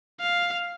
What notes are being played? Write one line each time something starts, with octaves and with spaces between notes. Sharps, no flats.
F5